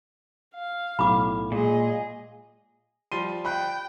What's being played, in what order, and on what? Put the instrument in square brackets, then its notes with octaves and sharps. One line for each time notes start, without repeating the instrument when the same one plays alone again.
[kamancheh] F5
[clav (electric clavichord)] B1 A2 [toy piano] B5 D6
[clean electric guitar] A#2 [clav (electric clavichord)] G#3 [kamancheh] G#4 D#5
[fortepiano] F3 G3 C6 [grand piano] D#7
[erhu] G5 [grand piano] B5 F#6